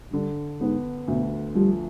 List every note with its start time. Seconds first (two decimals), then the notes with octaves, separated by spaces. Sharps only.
0.13 G2 D3
0.61 G#2 B3
1.08 D2 B2
1.55 F3 G3